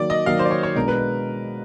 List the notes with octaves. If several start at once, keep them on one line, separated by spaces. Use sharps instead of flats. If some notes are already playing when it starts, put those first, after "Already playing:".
Already playing: D#3 F#3 A#3 D5
D#5
D#3 F#3 A#3 F5
C5
D5
C#5
C#5
B2 G#3 B3 D4 A#4
B4